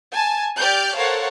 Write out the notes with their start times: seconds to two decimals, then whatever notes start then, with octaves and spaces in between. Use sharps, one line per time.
0.12 G#5 A5
0.58 G4 D5 F6 G6
0.95 A4 A#4 C5 C#5 F5 F#5